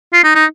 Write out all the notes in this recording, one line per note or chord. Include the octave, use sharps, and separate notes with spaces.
F4
D#4
D#4